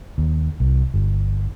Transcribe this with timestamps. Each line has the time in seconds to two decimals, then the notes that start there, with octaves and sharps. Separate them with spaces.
0.18 D#2
0.60 C2
0.94 G1